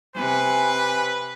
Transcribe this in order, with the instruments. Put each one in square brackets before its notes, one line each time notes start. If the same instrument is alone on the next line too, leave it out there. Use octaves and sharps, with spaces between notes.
[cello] C3 [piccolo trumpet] B4 [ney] G#5